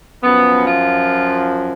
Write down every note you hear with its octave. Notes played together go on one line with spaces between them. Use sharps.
F#2 F3 B3
F4